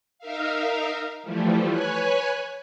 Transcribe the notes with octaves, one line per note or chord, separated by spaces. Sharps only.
D#4 A#4 E5 F5
E3 F3 G3 A3
B4 C#5 G#5 F#6